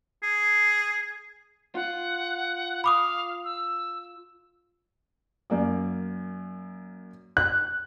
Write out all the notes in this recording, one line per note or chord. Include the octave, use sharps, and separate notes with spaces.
G#4
F4 F#5
F5 B5 D6 D#6
E6
F#2 A#3 D5
F#6